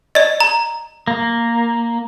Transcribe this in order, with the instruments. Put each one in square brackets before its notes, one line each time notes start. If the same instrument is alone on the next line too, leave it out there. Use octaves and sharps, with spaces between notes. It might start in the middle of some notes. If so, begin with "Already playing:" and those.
[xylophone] D5 D#5
A#5
[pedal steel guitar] A#3